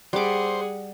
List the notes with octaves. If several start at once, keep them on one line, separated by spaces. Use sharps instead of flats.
G3 G#4 C5 F#5 D6